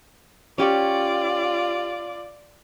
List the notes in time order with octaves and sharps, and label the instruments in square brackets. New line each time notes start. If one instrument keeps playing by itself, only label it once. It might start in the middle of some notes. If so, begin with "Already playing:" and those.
[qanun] C#4 G4 C#5 [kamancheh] F4 D5